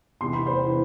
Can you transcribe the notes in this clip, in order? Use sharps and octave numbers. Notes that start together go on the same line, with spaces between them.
E2 C3 E3 C6
B5
C5 C6
C3 E3